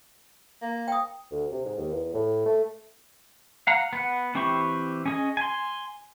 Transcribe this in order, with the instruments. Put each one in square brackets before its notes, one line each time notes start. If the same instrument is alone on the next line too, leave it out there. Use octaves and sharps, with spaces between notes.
[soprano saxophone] A#3
[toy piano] G5 D#6
[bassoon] D2
C3
G#2
D#2
E2
A2
A3
[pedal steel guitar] F5 F#5 A#5
B3 F#5
E3 C4 E4 G4 C#6
C#4 G#4 D#5
G#5 C6